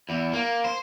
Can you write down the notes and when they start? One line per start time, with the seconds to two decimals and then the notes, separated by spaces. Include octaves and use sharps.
0.09 E2
0.33 A#3
0.64 C5